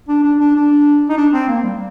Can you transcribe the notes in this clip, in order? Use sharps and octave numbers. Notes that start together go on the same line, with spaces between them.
D4
D4
D4
D4
D#4
D4
C4
A#3
G3